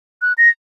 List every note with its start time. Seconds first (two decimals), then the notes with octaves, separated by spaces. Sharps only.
0.22 F#6
0.38 A#6